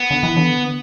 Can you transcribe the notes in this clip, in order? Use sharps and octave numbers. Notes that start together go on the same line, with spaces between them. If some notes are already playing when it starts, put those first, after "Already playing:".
Already playing: B3
D3
E3
D3